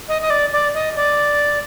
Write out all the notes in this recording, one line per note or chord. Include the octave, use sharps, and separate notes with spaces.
D#5
D#5
D5
D5
D#5
D5